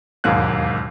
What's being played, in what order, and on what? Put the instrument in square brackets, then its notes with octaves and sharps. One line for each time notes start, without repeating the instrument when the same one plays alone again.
[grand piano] E1 D#2 G#2 F#3 A#3 F#6